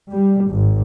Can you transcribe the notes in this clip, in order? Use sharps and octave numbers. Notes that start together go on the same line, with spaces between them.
G3
G#1